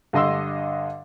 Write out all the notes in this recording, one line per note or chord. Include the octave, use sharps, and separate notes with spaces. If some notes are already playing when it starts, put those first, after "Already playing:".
G2 D3 D#5 C6 E6